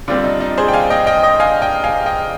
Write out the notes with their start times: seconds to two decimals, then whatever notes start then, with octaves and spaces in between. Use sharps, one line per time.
0.08 D3 G3 C4 D4 F4
0.24 D#4
0.40 D#4
0.58 G#4 C5
0.68 G5
0.73 F5 G#5
0.90 D#5 G5
1.07 D#5 G5
1.23 D#5 G5
1.40 F5 G#5
1.62 D#5 G5
1.83 F5 G#5
2.06 D#5 G5